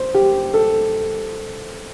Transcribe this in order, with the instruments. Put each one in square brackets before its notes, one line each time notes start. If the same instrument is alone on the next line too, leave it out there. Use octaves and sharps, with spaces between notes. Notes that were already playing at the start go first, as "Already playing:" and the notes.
Already playing: [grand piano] C5
G4
A4